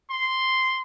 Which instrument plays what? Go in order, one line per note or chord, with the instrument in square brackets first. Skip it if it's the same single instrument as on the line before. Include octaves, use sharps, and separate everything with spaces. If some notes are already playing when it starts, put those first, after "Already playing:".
[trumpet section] C6